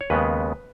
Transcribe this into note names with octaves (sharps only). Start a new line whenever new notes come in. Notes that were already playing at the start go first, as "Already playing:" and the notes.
C#5
D#2 C#3 G#3 B3 B4